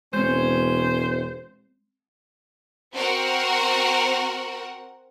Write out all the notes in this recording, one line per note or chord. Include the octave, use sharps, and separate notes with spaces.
E1 G#3 C4 C#4 C5
C4 F#4 A#4 F#5